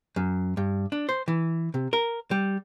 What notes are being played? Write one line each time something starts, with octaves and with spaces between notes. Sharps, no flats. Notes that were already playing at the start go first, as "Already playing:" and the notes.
F#2
G2
D4
C5
E3
C3
A#4
G3